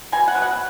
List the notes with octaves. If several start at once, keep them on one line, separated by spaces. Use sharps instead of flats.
B2 G#5
F#5
F#3 B3
F#5